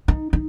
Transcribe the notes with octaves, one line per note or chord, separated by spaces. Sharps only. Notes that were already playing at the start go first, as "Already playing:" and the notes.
D#4
D#4